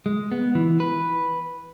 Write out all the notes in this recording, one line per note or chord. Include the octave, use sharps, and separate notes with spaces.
G#3
B3
E3
B4